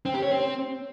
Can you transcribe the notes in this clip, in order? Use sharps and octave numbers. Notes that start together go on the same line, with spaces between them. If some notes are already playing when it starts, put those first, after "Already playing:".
C4
G4
C#5
C4